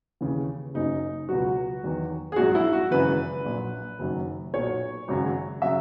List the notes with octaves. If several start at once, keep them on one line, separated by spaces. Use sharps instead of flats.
D#2 C#3 E3
F#1 F#2 C#3 D#4
C#2 B2 F#3 F#4
E2 D#3 F#3
G#4
A#1 G#2 F#3 F#4
E4
F#4
G#1 F#2 C#3 E3 B4
A#1 A#2 F#3
F#1 F#2 D#3 F#3
B1 A#2 F#3 C#5
G#1 F#2 C#3 F#3
C#3 F#3 E5